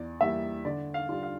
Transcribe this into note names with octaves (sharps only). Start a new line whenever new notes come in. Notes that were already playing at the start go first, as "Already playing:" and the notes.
Already playing: E2 D5
E3 G3 A#3 E5
D3 D5
F5
G3 D4 F4
F5